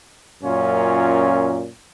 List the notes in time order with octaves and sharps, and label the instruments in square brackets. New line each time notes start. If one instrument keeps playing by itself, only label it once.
[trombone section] F#2 A#2 C#4 F4